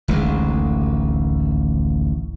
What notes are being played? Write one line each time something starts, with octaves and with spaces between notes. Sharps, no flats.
D1 A1 D#2 G#3